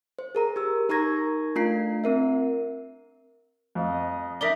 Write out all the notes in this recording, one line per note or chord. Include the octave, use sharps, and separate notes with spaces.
C5
G#4 A#4 A#5
G4 E6
D#4 A#4 A#5 C#6 G#6 A#6
A3 D4 F4 A#5 C7
C4 A#4 E5
F2 D#5
D#4 A#4 D5 E5 B6 G7